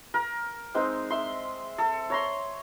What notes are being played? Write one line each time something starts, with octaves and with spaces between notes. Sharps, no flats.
A#4
G#3 C4 D#4
E5 C6
A4
C#5 A#5 C6